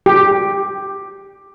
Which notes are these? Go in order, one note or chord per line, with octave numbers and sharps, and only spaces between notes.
G4